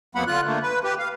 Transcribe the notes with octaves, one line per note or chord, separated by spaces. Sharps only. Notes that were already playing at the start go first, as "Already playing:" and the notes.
F2 F#3 A#3 B3 F#5 B5
D3 F4 F#6
D3 A3 A#3
B4
G4 B4
F5